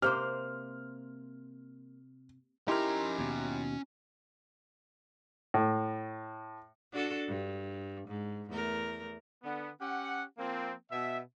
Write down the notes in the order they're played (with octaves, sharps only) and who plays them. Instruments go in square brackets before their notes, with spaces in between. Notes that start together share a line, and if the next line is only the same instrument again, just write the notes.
[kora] C3 A#3 C5 [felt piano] F6
[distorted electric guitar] C#4 A#5 [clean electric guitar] D#4 A#4 [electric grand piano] E4 G4 C6
[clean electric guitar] D#2 B2
[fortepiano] A2
[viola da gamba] D4 F#4 A4
G2
G#2
E2 A3 A#4
[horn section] D3 B3
C#4 G4 F#5
F3 A#3 C4
B2 E5